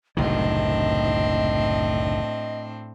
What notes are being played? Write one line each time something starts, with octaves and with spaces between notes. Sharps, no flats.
F#1 C2 A2 D#3 C4 D4 D#5